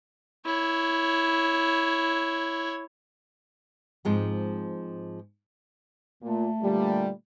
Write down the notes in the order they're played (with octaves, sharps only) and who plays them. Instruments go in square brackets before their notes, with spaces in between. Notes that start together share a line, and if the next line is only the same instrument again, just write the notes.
[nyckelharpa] E4 C#5
[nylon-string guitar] G#2 F3 G#3 C4
[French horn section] A#2 [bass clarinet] A3
[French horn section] A#2 D3 G3